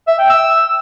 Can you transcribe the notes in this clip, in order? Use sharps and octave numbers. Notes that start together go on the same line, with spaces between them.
E5
G5
E6